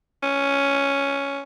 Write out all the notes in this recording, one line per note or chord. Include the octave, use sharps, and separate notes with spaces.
C#4